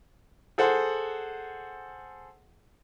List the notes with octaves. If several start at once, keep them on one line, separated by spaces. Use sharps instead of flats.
G#4 A4 C5 F#5